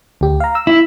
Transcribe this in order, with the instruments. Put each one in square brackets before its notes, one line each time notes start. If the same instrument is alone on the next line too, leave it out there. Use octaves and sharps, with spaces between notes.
[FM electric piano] D2 G4
F5 A#5
E6
[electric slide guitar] E4